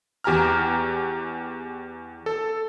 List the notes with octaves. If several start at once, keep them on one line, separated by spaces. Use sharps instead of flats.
E2 G4 G#5 A#5 F6
A4